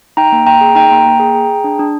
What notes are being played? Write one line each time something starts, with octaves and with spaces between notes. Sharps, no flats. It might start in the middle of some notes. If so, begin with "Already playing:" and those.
D#4 G5 A#5
A#3
A#3 G5 A#5
G#4
D#4 G5 A#5
A#3
A#3
G#4
G#4
G#4
D4
D4